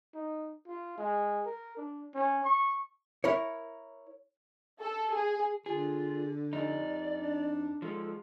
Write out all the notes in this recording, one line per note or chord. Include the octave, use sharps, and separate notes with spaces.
D#4
F4
G#3
A#4
D4
C#4
C#6
E4 A#4 C#5
A4
G#4
D3 F4 G#4
F2 D#4 D5
D4
F3 G#3 A4